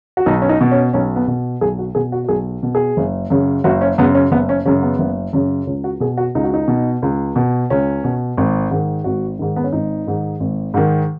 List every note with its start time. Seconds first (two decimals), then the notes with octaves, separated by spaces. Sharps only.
0.17 F#4
0.26 B1 D#4
0.42 C#4
0.49 D#4
0.61 B2
0.71 C#4
0.93 B1 C#4
1.16 B3
1.27 B2
1.61 B1 G#4
1.79 F#4
1.95 B2 G#4
2.12 F#4
2.24 F#4
2.29 B1 G#4
2.63 B2
2.75 G#4
2.97 F#1
3.30 F#2 C#3
3.64 F#1 F#4
3.81 C#4
3.98 F#2 C#3 B3
4.15 C#4
4.31 F#1 B3
4.49 C#4
4.65 F#2 C#3 C#4
4.83 B3
4.99 F#1
5.33 F#2 C#3
5.67 C#2 C#4
5.84 F#4
6.00 B2 G#4
6.17 F#4
6.35 C#2 D#4
6.44 F#4
6.54 D#4
6.68 B2
7.02 C#2
7.36 B2
7.70 C#2 C#4
8.04 B2
8.37 G#1
8.71 G#2 D#3
9.04 G#1 F#4
9.39 G#2 D#3
9.56 B3
9.64 C#4
9.73 G#1 D#4
10.07 G#2 D#3
10.40 G#1
10.74 G#2 D#3